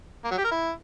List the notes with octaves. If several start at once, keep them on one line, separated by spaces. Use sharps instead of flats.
A#3
F#3
G4
A#4
E4